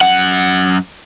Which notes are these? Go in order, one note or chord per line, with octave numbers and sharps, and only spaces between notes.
F#2 F#5